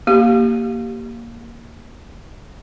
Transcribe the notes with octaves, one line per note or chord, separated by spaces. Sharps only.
A#3 G4